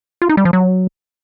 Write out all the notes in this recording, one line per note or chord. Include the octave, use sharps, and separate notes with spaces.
F4
D#4
G3
F3
F#3